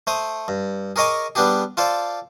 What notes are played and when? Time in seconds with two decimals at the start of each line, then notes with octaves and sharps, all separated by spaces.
0.07 A3 C5 D#6
0.48 G2
0.96 G#4 A#4 C#5 D#5 G#5 D6
1.35 G3 B3 D4 G4 G#4
1.77 F4 A4 C5 D5